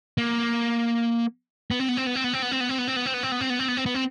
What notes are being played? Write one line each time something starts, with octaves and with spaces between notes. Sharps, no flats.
A#3
B3
C4
B3
C4
B3
C4
B3
C4
B3
C4
B3
C4
B3
C4
B3
C4
B3
C4
B3
C4
B3
C4
B3
C4
B3
C4